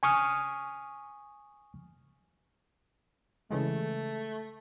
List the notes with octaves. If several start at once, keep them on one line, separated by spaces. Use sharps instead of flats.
G#5 C#6 D#6 F6
C#3 E3 G#3 A3